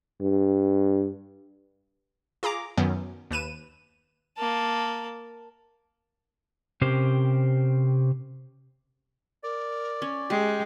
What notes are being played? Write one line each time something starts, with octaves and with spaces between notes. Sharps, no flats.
G2
F4 G#4 A#5 D6
F#2 D#3 F#3 B3 C#4
D#2 B4 D#7 E7
A#3 A5
C3 C4 C#4 G4 A#4 C5
A#4 D5
C#4
G#3 G4 G5